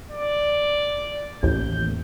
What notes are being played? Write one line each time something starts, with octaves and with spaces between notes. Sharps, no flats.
D5
A1 D#2 G6